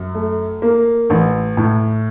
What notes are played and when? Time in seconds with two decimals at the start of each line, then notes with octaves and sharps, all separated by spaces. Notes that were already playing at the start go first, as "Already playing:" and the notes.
Already playing: F#2
0.14 A3
0.62 A#3
1.10 A1
1.57 A2